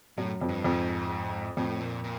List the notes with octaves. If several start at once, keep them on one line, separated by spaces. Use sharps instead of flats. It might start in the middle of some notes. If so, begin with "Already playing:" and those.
F#2 A2
F2
G2
F2 G#2
F2 A2
A#2
A#2